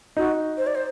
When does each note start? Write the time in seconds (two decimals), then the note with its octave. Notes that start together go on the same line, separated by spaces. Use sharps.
0.17 D#4 F#4
0.58 C5
0.67 D5
0.75 C5